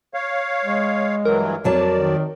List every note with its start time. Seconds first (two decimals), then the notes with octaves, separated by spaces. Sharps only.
0.14 C#5 F5
0.65 G#3
1.25 G2 E3 F#3 A#4
1.64 F2 F#3 D5 A5
1.97 D#3